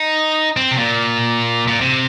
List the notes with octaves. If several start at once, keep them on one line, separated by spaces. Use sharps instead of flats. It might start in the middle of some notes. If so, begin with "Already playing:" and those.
Already playing: D#4
C4
C3
A#2
A#2
C3